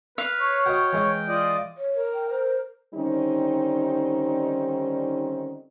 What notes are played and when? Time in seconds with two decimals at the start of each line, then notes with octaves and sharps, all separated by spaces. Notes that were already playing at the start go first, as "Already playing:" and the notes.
0.18 B4 F5
0.40 C#5
0.66 F#4 B4 D#5 G5
0.93 E3 G#3 E4
1.29 F4 D5 D#5
1.78 C#5
1.95 A#4
2.14 G5
2.30 C5
2.94 D3 D#3 G3 C4 C#4 D#4